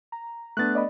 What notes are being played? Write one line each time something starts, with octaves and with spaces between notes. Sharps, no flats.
A#5
A3 B3 D4 F#6 A6
D5 D#5 B5